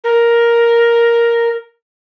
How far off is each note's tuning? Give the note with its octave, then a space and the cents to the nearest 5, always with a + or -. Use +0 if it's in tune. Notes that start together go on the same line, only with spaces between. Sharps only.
A#4 +5